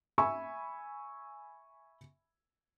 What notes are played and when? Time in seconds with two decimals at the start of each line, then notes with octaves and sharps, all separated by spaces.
0.18 E5 G#5 B5 C#6 E6